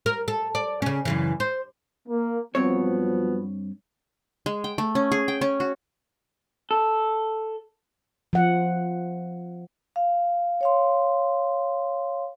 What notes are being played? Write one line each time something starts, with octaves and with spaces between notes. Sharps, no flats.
A#4
A4
D5
C#3 C#4
F#2 C#3 E3
C5
A#3
G2 F3 F#3 B3 C4 C#5
G#3
G5
A3
C#4
G#4
G5
C#4
F#4
A4
F3 F#5
F5
C#5 F5 C6